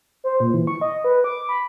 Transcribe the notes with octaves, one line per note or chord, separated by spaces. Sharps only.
C5
A#2
E3
C#6
D#5
B4
D6
B5